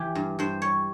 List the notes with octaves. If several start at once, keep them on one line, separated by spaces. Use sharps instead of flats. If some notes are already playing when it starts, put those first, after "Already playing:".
Already playing: E3 G4
G2
G2 C5
G3 C#5